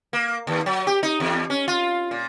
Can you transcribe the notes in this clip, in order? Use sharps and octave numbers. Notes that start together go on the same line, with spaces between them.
A#3
D#2
F#3
G4
D#4
E2
C#4
F4
A#2